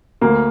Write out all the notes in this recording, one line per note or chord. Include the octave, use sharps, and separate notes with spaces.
D2 A#3